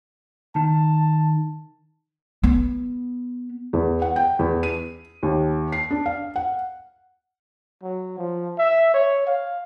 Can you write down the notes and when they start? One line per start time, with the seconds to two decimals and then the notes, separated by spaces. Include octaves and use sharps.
0.56 D#3 A5
2.43 B3
3.73 E2
4.02 F#5
4.16 G5
4.39 E2
4.63 D#7
5.23 D#2
5.72 C7
5.91 D4
6.06 F5
6.36 F#5
7.83 F#3
8.18 F3
8.59 E5
8.94 C#5
9.27 F5